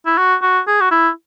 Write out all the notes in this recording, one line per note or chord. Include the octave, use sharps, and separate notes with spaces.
E4
F#4
F#4
G#4
F#4
E4